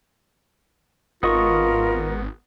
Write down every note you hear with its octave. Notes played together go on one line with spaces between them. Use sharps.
G#1 B3 F4 A#4 D#5 C#6